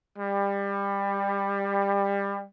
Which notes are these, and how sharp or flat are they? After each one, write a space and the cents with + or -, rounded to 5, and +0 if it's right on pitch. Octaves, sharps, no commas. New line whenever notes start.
G3 +25